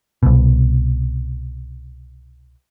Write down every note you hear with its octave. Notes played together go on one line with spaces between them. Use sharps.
C2 B2